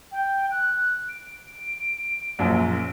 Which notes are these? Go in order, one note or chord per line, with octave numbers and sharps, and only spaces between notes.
G5
F#6
D7
A#1 F#2 A#2